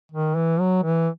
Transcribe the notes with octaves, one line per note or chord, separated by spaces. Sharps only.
D#3
E3
F#3
E3